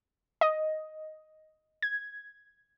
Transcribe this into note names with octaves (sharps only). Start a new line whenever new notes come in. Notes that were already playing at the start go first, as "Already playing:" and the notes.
D#5
G#6